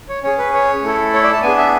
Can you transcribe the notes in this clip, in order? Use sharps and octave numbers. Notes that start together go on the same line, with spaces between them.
C#5
C#4 G#4 C#5
B4
C#5
A3 E4 A4
C#5
D5
A5
B3 D4 G#4 G#5
E5